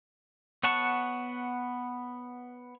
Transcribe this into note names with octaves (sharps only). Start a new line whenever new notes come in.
B3 C#5 F#5 A5 C#6